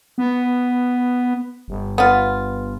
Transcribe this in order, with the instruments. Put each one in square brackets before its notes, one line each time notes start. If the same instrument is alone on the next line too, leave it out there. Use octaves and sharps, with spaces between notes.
[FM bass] B3
G1
[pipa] B3 F4